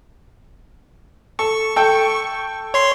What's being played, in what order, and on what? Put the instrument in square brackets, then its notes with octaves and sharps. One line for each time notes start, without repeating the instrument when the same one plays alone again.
[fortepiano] A4 [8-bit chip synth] C#6
[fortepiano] A4 G5
[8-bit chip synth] C#5 C6